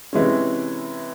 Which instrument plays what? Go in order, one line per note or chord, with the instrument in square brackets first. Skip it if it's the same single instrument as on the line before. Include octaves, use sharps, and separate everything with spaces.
[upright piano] C3 E3 G#3 C#4